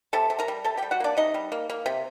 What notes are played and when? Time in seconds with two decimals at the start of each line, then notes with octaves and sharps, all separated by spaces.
0.13 C3 A4 A5
0.30 C3
0.39 A#4 A#5
0.48 G3
0.64 C3 A4 A5
0.77 G4 G5
0.82 G3
0.91 F#4 F#5
1.00 A#3 D4 D5
1.17 C3 D#4 D#5
1.34 G3
1.52 A#3
1.70 A#3
1.86 C3